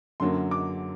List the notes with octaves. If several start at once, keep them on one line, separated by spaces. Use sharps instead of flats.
F#2 D3 F#3 A#3 C6
D6